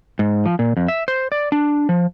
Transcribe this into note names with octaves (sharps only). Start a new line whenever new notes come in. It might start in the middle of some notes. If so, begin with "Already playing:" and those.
G#2
F3
A#2
F2
E5
C5
D5
D4
F3